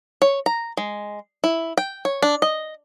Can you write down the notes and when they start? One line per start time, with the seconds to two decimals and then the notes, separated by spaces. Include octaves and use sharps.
0.22 C#5
0.46 A#5
0.77 G#3
1.44 E4
1.77 G5
2.05 C#5
2.22 D4
2.42 D#5